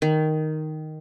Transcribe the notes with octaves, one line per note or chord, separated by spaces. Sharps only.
D#3